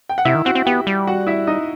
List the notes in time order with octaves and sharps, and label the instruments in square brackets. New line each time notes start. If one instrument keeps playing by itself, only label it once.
[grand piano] G5
F#5
[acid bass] C3 [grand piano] E4 E5
[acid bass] D#3
[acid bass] C4 [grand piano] F#4 F#5
[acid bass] C4
[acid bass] B3 [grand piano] G4 G5
[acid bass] G3
[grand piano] F#4 F#5
E4 E5
D#4 D#5